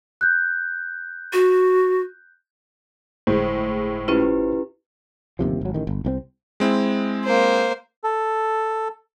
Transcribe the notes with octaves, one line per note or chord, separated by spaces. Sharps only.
F#6 G6
F#4
G1 A2 G#3 C5
C#4 E4 F4 G4 B4
G1 D#2 C3 F3
G#1 F#3
A1 D#3
G1
C2 E3 C4
G#3 C4 E4
A#3 C5
A4